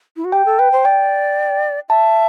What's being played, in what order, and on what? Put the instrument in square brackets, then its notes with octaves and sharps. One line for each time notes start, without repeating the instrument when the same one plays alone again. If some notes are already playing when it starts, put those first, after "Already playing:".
[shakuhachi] E4
F#4
[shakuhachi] G4 [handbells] G5
[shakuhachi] A4
[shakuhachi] B4 [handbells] G5
[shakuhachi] C5
[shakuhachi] D5 [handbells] G5
[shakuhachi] E5 [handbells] A5